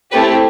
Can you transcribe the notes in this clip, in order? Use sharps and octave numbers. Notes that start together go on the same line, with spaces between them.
A3 C4 E4 G4 B4